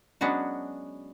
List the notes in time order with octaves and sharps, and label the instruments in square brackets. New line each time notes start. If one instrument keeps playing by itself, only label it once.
[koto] F#3 G#3 B3 C#4 D4 F#4